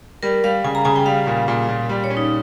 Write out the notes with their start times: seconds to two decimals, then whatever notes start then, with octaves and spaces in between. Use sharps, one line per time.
0.23 G3 A#4
0.44 G3 F5
0.64 C#3 G#5
0.75 A#5
0.85 C#3 G#5
0.96 G5
1.06 G3 F5
1.27 A#2
1.48 A#2
1.68 A#2
1.89 G3
2.04 C#5
2.10 C#4
2.17 D#4